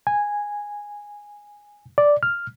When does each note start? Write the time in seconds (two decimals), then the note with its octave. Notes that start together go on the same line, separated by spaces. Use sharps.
0.07 G#5
1.98 D5
2.23 F6